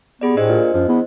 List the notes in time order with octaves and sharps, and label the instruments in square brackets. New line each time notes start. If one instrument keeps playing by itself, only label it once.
[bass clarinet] B3 [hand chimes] G4 G#4 D5
[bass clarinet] A2 [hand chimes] D4 C5 D#5
[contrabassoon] A#2
[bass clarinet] F#2 [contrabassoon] F3
[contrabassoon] E2 [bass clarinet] B3